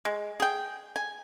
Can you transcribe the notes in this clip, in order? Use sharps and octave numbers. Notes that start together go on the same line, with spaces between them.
G#3
G#4 G5
G#5